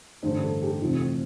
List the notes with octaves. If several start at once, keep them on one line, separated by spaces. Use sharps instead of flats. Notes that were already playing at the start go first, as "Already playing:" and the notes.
A1 G2 D3 C5
A4
G4
F1 F2 E3 F4